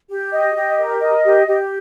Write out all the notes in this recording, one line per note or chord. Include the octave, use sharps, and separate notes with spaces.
G4
D#5
G4
A#4
D#5
G4
G4